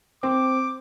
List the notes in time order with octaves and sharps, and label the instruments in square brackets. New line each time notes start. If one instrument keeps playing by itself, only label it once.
[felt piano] C4 [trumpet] D6